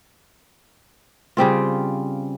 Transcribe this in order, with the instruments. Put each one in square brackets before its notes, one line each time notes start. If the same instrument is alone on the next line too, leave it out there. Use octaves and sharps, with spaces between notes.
[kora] C#3 G3 C4 F4